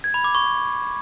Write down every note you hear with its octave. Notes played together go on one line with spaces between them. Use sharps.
G#6
B5
D6
C#6